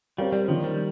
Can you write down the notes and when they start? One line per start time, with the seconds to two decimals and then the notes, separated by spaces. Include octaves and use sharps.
0.18 G3 C4 G4 A#4 C#5 F5
0.32 G3
0.48 D#3 F3 A#3 D#4
0.64 G3